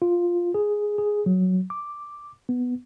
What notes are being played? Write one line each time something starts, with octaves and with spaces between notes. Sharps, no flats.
F4
G#4
G#4
F#3
D6
B3